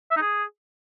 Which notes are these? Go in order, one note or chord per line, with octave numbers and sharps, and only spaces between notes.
E5
D#4
G#4